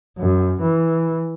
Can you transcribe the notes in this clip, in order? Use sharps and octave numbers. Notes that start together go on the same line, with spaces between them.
F#2
E3